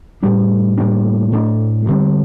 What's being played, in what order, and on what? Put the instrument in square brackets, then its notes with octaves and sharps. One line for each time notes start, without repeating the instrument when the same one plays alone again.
[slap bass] A2 G3 D4
A2 G3 A#3 D4
A2 A3 D4
D2 D3 G3 C4